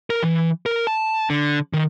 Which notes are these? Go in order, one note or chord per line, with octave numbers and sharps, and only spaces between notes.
A#4
E3
A#4
A5
D3
D#3